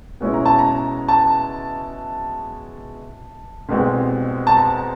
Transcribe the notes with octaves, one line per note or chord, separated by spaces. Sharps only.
B2 G#3 C#4 E4
A#5
A5
A#5
A5
C2 B2 G#3 C4
A5
A#5